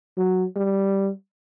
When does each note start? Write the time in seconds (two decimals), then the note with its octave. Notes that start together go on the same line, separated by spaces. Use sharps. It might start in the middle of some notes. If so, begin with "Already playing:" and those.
0.17 F#3
0.56 G3